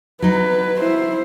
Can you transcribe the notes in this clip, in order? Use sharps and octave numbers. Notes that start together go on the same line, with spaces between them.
F#3 D#4 B4
E4 C5